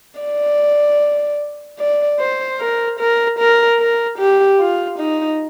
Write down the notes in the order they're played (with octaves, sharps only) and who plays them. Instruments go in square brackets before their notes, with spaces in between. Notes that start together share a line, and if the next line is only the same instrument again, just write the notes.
[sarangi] D5
D5
C5
A#4
A#4
A#4
A#4
G4
F4
D#4